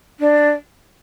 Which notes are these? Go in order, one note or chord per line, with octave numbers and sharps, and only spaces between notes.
D4